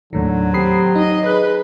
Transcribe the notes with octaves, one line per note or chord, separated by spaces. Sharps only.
D#2 A2 D3 D#3 F#3
C4 G4 B5 D#6 C7
D#4 D#5
G#4 B4 F#6